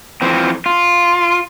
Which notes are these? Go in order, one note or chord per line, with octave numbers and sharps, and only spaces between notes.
E3 F3 C4
F4